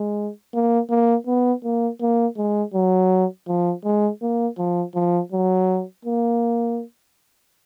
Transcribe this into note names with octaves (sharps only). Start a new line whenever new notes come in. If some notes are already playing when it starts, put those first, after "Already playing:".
Already playing: G#3
A#3
A#3
B3
A#3
A#3
G#3
F#3
F3
G#3
A#3
F3
F3
F#3
A#3